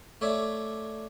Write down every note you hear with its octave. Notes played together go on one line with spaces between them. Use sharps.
A3 C#5 D5 E5